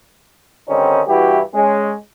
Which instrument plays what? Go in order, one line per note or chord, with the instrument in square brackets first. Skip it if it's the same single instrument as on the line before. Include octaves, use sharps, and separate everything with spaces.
[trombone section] D3 D#3 G3 C4 C#4 D#4
G2 E3 E4 F#4 G4
G#3 C#4